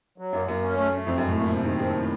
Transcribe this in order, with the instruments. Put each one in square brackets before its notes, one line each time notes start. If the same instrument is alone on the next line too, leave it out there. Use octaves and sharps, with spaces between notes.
[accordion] F#3
[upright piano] F#2 [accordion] A#3
[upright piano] F#2 [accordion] A#3
[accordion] C#4
A3
A3
[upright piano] F2 [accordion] C4
[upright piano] F#2 [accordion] A3
[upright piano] A2
[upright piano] A#2 [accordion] A3
[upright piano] C3 [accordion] F3
[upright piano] D#3 [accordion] C4
[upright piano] D#3 [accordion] F3
[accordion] A2